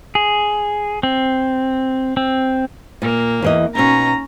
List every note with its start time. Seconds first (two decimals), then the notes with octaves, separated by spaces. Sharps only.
0.15 G#4
1.03 C4
2.17 C4
3.02 A#2 A#3
3.42 E2 E3 D#5
3.75 B2 C#4 D#4 A#5